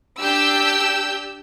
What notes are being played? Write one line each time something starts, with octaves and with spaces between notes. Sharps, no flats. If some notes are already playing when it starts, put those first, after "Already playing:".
D4 G4 E6 G6